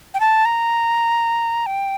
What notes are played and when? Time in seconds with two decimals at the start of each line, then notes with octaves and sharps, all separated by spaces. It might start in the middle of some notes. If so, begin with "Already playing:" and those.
0.14 G5
0.20 A5
0.45 A#5
1.66 G5